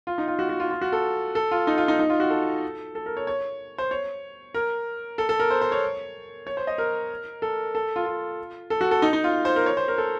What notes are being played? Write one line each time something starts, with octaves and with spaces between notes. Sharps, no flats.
F4
D#4
F4
F#4
F#4
F4
F4
F#4
A4
A4
F4
D#4
F4
D#4
D#4
F4
F#4
A4
A4
A#4
C#5
C#5
C5
C#5
A#4
A4
A4
A#4
C5
C5
C#5
C#5
C5
D#5
A#4
A4
A4
F4
F4
A4
F#4
A4
D#4
D#4
F4
C5
A#4
C#5
C5
A#4
A4